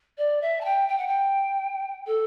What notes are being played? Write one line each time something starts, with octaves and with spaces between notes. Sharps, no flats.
D5
E5
A5
G5
G5
F#5
G5
A4